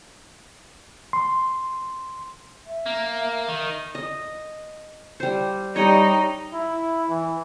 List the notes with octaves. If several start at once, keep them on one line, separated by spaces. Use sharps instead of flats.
C6
E5
A#3
D#3
D#5
G3 C5
G3 D#4 C#5 D#5 G5
E4
E3